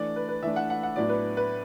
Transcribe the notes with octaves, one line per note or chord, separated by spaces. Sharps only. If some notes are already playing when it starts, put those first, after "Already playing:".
Already playing: E3 A3 D4 D5
B4
B4
E3 A3 D4 E5
F#5
F#5
F#5
A2 F#3 B3 D4 D5
B4
B4